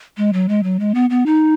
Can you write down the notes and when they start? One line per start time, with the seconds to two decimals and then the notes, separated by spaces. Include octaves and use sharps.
0.17 G#3
0.33 F#3
0.49 G#3
0.63 F#3
0.80 G#3
0.95 B3
1.10 B3
1.26 D#4